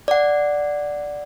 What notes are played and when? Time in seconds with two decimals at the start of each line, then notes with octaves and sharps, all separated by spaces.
0.08 D5 F#5